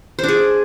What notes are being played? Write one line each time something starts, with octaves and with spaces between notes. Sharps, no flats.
D4 G#4 C5